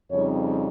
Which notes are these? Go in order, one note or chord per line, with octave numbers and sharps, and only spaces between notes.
F2 C#3 G3 C4 D#4 C#5